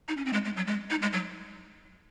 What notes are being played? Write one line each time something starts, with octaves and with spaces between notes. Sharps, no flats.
D#4
C#4
C4
G#3
G#3
F#3
G#3
D#4
G#3
F#3